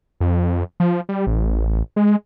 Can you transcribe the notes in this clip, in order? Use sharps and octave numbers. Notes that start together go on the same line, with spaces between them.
F2
F3
G3
A1
G#3